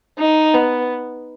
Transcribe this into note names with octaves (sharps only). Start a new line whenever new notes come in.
D#4
B3